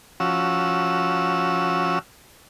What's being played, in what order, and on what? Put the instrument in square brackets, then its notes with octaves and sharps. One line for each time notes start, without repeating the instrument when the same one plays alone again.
[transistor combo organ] F3 C#4 F#4 E6